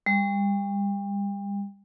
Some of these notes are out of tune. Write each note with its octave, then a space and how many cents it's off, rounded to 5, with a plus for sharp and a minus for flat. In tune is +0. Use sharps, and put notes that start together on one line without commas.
G3 +35